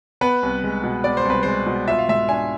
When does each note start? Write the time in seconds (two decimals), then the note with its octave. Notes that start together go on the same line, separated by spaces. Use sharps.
0.21 B3 B4
0.43 C2
0.64 G#3
0.83 B2
1.04 B3 D5
1.17 C5
1.25 C2 B4
1.43 G#3 C5
1.66 B2
1.88 F4 E5
1.99 F5
2.09 G#2 E5
2.28 D4 G#5